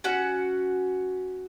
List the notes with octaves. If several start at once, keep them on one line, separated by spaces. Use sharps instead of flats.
C#4 F#4 F#5